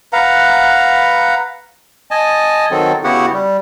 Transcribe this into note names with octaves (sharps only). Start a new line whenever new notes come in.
B4 F5 F#5 A#5
D#5 G#5 A5
D#3 F#3 C4 A4
C#3 B3 E4 F#4 G4 F#5
G3